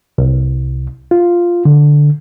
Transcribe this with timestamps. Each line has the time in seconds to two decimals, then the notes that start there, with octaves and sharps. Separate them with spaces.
0.18 C2
1.11 F4
1.65 D3